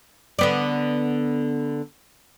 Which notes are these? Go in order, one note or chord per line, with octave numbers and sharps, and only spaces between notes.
D3 B3 D5